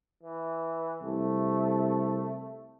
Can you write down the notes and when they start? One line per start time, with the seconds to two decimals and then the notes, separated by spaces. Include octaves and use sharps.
0.23 E3
1.02 C2 A3